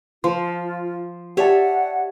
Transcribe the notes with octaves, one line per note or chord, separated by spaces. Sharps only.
F3 F4 C6
G4 C#5 D5 E5 F#5 A5